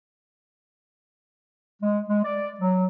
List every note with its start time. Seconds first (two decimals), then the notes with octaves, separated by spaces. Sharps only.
1.82 G#3
2.08 G#3
2.24 D5
2.61 F#3